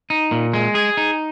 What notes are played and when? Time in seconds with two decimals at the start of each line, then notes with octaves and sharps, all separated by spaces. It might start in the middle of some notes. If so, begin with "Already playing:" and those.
0.10 D#4
0.31 A#2
0.54 G#3
0.75 G#4
0.97 D#4